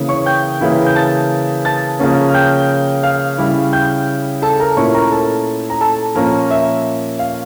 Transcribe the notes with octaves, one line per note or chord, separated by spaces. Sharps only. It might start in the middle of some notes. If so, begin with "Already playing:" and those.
Already playing: C#3 E3 A#3 C#4 E4
C#5 C#6
G5 G6
C#3 E3 A#3 E4
G6
A5 A6
A5 A6
C#3 F3 A#3 C#4
F6
G5 G6
F5 F6
C#3 G3 C#4 E4
G5 G6
A4 A5
A#4 A#5
A#2 A3 C#4 E4 C#5 C#6
A#4 A#5
A4 A5
A#5
A4 A5
A#2 F3 A#3 C#4 A#4 A#5
E5
F5